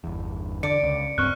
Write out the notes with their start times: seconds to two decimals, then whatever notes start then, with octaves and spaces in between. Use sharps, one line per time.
0.04 G1 E2
0.63 D3 D5 C#7 D7
0.83 C#2
1.18 D1 G2 C4 C#6 F6 F#6